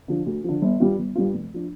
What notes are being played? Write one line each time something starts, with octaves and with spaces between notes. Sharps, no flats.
D3 F3
D2
D3 F3
G1
G2 G3 F4
G1
G2 G3 F4
F1
F3 D4